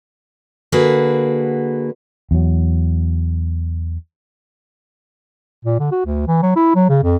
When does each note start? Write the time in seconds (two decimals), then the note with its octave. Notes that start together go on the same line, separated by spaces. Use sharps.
0.72 D3 A#3 F#4 G#4 B4
2.31 E2 F#3
5.65 A#2
5.79 D3
5.91 F#4
6.05 D2
6.27 E3
6.43 F#3
6.56 E4
6.75 F#3
6.89 C#3
7.03 F2